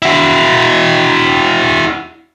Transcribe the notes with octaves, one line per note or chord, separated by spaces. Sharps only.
E4 F#4